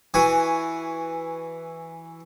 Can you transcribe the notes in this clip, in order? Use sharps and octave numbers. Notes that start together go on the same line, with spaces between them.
E3 F#4 G#5